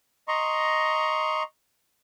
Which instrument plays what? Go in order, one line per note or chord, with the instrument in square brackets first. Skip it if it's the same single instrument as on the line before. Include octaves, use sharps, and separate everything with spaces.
[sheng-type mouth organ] D#5 A#5 C6 C#6